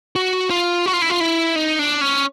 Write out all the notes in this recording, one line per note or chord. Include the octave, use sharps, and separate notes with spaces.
F#4
F4
F#4
F4
E4
F4
E4
D#4
D4
C#4